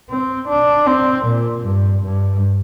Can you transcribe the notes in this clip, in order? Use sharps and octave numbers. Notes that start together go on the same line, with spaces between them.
C4
D4
C4
A#2
G2
G2